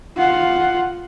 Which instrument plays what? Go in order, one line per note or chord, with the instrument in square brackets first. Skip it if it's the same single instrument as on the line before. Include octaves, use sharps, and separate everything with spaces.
[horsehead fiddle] F4 F#5